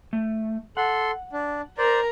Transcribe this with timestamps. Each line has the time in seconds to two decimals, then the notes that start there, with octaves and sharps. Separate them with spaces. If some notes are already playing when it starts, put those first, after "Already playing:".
0.13 A3
0.77 A4 F#5 C6
1.32 D4
1.78 A#4 C5 D5 A#5